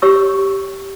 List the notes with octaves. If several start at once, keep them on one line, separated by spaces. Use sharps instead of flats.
G4 C#5 C#6 E6